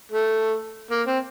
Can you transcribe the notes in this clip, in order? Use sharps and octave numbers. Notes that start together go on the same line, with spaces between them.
A3
A#3
C4